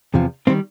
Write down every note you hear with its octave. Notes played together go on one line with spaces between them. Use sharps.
E2 C3 F3
D#3 G3 A#3 C4